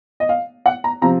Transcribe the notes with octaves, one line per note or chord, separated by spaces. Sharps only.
D#5
F5
F#5
A#5
C3 F3 C4 A#5